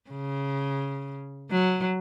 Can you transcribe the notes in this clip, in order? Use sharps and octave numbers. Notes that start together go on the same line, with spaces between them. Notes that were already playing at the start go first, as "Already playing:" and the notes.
C#3
F#3